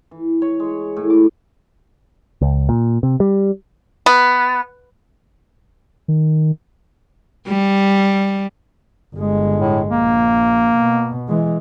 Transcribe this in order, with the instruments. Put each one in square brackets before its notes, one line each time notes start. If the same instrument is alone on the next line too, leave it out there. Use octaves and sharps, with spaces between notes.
[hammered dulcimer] E3
C#5
G#3
A2
D6
[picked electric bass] C#2
A#2
C3
G3
[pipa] B3
[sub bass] D#3
[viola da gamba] G3
[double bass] G1 G#3
[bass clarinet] A2
[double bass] A#1 [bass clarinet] A#3
[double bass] B2
E3 G#3